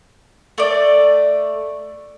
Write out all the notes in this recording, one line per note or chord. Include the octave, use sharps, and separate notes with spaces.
A3 D5